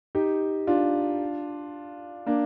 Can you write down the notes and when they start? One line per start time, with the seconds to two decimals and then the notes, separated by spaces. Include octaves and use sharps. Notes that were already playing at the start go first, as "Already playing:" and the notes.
0.15 D#4 G4
0.67 D4 F4
2.26 A#3 D4